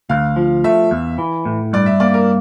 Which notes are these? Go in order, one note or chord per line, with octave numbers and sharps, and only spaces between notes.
D2 F5
F3
A3 E5
E2
E3
A2
G2 D5
E5
A#3 D5
A#4